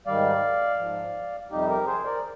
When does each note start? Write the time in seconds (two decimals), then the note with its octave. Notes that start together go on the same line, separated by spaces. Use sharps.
0.07 G#2 D#3 G3 D5 F5
0.79 G#2 F3
1.51 F2 C3 G3 D#4 G4
1.69 G4 A#4
1.86 G#4 C5
2.05 A#4 D5